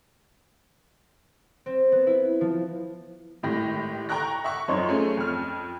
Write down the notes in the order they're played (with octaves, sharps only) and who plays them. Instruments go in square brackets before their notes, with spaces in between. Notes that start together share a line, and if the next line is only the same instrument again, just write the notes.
[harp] C4
B3
E4
F3
[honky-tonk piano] G#1 A2 G4 A#6
G5 A#5 C#6 F#6 A#6
E5 F#5 C#6
F#2 F3 D#4 C#5 D#5 C6
A3 C#4 G#4
F2 F6